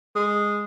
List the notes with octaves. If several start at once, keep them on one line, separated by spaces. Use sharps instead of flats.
G#3